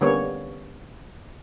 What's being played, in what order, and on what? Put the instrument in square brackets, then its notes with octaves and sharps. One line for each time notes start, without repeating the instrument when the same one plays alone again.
[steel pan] D3 G3 A#3 B3 C#4 C#5